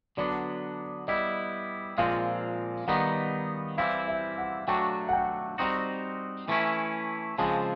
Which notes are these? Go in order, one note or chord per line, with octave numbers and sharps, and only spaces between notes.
D3 F#3 B3 D4 D5
G3 B3 E4 D#5
A#2 F3 G#3 C4 F5
D#3 G3 B3 D#4 F#5
E3 G3 C4 E4 F5
E5
F#5
F#3 A3 D4 F#4 G5
F#5
G5
G3 C4 D#4 F#4
E3 A3 C#4 E4
C#3 F3 G#3 C4 A5